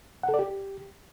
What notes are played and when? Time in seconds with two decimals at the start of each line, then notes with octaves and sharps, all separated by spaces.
0.23 F#5
0.29 A4
0.34 D5
0.39 G4